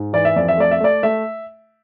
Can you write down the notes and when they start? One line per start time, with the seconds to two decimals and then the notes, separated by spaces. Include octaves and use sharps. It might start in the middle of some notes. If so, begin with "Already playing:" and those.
Already playing: G#2
0.13 E3 D5
0.25 E5
0.36 F2 D5
0.48 E5
0.57 A3 D5
0.71 E5
0.80 A3 D5
1.03 A3 E5